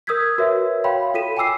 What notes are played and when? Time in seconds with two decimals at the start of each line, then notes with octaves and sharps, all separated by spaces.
0.07 A#4 D#6 E6 G6 G#6 B6
0.38 F#4 A#4 B4 C#5 E5
0.84 C#5 F5 G5 B5 C6
1.14 F4 A4 B6 D#7 E7
1.37 G5 G#5 D6 E6 C7